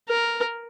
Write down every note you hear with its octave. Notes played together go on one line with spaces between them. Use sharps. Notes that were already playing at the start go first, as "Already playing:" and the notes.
A#4